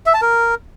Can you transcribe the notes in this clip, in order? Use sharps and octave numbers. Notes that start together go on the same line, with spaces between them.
E5
A5
A#4